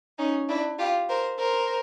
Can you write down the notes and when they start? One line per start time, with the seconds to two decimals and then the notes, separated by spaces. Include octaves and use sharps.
0.18 C#4 D#4
0.48 D4 E4
0.78 F4 G4
1.09 A#4 C5
1.39 A#4 C5